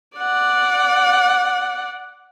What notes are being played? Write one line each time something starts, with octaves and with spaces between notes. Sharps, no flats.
D5 F#5